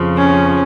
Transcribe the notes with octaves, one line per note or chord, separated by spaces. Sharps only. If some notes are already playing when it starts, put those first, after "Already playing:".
Already playing: F2 C#3 F3
C#4